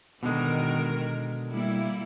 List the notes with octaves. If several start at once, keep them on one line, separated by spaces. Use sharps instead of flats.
B2 D3 D#3 G#3 A#4
G3 A#3 E4